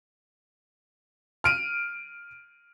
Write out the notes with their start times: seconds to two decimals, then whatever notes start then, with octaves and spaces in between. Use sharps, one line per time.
1.44 F6 D7 D#7